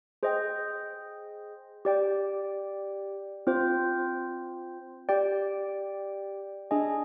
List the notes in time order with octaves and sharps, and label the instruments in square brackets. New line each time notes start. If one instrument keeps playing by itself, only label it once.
[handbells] G#4 C5 D#5 G5
G4 D5 G5
C4 F4 C5
G4 D5 G5
D4 G#4 D#5 G#5